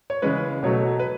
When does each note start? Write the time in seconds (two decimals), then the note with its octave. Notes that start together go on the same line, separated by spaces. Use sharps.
0.10 C#5
0.22 C#3 E3 G#3 C#4 B4
0.63 B2 F#3 A3 C#5
0.99 B4